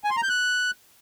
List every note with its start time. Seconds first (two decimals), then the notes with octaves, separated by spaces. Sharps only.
0.04 G#5
0.10 C6
0.17 A#5
0.23 G6
0.29 F#6